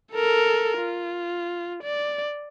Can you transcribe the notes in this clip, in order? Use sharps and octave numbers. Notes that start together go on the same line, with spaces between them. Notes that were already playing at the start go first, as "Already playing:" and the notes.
A4 A#4
F4
D5